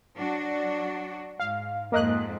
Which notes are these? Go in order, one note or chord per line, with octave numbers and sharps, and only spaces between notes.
F#3 D4 F#4
G#2 F5
F2 G#2 A#3 D#5 F#6